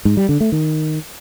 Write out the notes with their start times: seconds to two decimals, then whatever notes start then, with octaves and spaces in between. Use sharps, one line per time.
0.05 G#2
0.17 G3
0.29 D3
0.40 A3
0.52 D#3